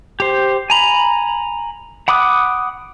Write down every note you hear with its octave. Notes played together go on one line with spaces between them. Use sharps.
G4 C5
G#5 A#5 B5
F#5 B5 D6 D#6 F#6